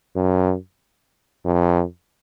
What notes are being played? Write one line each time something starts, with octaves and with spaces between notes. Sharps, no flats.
F#2
F2